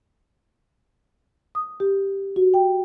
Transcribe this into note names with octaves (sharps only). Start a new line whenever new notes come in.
D#6
G4
F#4
G5